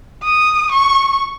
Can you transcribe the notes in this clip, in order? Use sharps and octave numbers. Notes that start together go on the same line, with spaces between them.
D#6
C#6